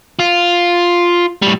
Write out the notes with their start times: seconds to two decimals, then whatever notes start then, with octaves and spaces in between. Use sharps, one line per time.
0.19 F4
1.42 A2 G3